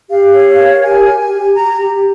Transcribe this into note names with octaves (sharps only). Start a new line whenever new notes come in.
G4 F5
C#5
A#4
G4 G#5
G4
G#5
G4
G4 A#5
G4